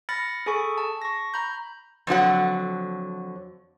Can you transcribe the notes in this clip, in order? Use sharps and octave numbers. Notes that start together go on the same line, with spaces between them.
B5 F6 A6 A#6 C#7
G#4 A4 G#5 B5 C#6
A5
C#6 A#6
A#5 B5 G6
F2 D3 F#3 F#5